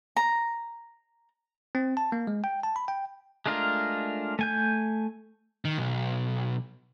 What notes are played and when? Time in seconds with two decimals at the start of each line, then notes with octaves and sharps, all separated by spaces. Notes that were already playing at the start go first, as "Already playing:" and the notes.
0.16 A#5
1.75 C4
1.97 A5
2.12 A#3
2.27 G#3
2.44 G5
2.63 A5
2.76 B5
2.88 G5
3.46 G#3 A3 D4 F4 A#4
4.39 A3 G#5 G6
5.65 D#3
5.78 B1